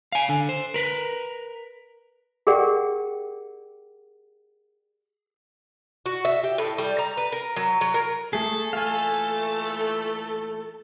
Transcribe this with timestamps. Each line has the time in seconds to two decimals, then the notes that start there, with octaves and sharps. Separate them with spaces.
0.12 F5 G#5
0.29 D3
0.49 C5
0.74 A#4 B4
2.47 G4 G#4 A#4 D5 F#5 G5
6.06 F#4
6.25 E5
6.43 G4
6.58 A2
6.78 G3
6.99 A#5
7.17 B4
7.32 A#4
7.56 F#3
7.81 F#3
7.94 A#4
8.33 A3 G#4 A4
8.73 A#2 E3 A3 F5 G#5